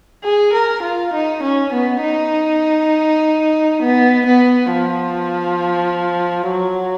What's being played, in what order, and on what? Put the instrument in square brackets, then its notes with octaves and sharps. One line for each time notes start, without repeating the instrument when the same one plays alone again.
[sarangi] G#4
A#4
F4
D#4
C#4
B3
D#4
B3
B3
F3
F#3